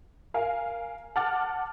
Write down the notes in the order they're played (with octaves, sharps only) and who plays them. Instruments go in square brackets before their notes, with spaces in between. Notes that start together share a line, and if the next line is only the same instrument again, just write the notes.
[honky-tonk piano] A#4 F5 G#5
F#5 A5 D6 F6 A6